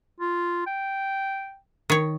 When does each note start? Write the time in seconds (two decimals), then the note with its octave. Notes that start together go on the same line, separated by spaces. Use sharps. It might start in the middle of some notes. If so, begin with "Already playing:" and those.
0.21 F4
0.67 G5
1.90 D#3 C#5